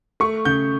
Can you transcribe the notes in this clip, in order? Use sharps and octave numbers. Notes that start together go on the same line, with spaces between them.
A3 C#6
C#3 G6